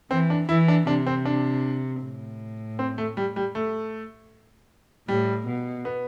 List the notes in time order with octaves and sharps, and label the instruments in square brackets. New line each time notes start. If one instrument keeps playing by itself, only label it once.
[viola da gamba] E3 [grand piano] C4
[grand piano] D4
[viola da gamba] E3 [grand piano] E4
[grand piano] D4
[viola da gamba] C3 [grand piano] D4
[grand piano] C4
D4
[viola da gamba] A2
[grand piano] C4
A3
G3
G3
A3
[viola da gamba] A2 [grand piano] G3
[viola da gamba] B2
[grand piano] B3